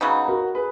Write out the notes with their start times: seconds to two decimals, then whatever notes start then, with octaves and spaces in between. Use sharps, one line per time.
0.01 C#3 F#3 B3 D#4
0.28 F#4 A#4
0.55 G#4 B4